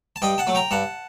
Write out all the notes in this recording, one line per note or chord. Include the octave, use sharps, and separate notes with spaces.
A5
G2 D#5 G5
F#5 A5
F#3 A3
G5 A#5
G2 F#5 A5